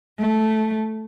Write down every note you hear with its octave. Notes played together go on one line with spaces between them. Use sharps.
A3